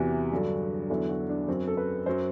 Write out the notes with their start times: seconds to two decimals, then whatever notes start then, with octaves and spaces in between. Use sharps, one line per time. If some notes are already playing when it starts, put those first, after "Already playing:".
Already playing: E2 C3 E3 F#4
0.32 G2 D3 F#3
0.90 E2 D3 F#3 E4
1.09 F#4
1.29 D4
1.48 F#2 F#3 C4
1.67 A4
1.77 B4
2.06 F#2 F#3 C5